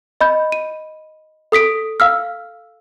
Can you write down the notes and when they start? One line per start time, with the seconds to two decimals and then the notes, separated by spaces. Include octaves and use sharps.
0.21 D#5 B5 G6
0.52 D#7
1.52 A4 D#6 B6 D7
2.00 F5 E6 F6